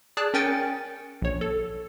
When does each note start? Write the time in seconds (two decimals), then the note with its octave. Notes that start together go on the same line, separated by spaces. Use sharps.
0.17 G#4 D5 A5 F#6
0.34 C#4 A#4 G5 G#5 A6 C#7
1.22 A#1 C#5
1.41 A4